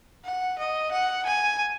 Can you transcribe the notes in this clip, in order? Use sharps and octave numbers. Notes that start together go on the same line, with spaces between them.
F#5
D#5
F#5
G#5